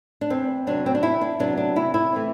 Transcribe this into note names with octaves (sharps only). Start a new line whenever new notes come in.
D4
E2 C4
C3 F#3 B3 D4
C4
D4
E2 E4
D4
C3 F#3 B3 D4
D4
C3 E4
E4
E3 A3 C4